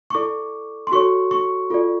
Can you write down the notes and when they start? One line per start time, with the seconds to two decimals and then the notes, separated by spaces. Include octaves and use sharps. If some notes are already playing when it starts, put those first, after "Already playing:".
0.10 C#6
0.15 E4 A4 D5 D6
0.87 C6
0.92 F#4 A4 C#5 C#6
1.31 C#6
1.70 F4 A4 D5